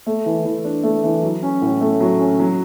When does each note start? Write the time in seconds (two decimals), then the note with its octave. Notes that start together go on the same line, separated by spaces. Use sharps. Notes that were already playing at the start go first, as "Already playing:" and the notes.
0.06 A3
0.26 E3
0.45 E3
0.64 D4
0.83 A3
1.04 E3
1.23 F#3
1.42 C#4
1.62 A2
1.81 A3
2.00 F#3
2.19 C#4
2.40 F#3